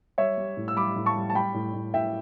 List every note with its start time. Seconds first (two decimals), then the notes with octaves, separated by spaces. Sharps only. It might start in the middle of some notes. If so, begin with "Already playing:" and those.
0.18 G3 C#5 E5
0.38 G3
0.57 A2
0.68 E6
0.76 G3 B5 D6
0.96 A2
1.06 A5 C#6
1.16 G3
1.30 A5
1.35 G3 G5 B5
1.54 A2
1.74 A2
1.94 A2 E5 G5